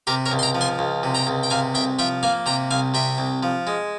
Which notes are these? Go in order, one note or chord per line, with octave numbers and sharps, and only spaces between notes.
C3 G4 A#4
A#4 C#5
C#2
C6
G5 A#5
F3
G#5 C6
C#2
C3
G5 A#5
C#2
G5
C3 F5 G#5
C2 E5 G5
F3 E5 G5
A#3 F5 G#5
C3 G5 A#5
C2 F5 G#5
C3 E5 G5
C2
F3
G#3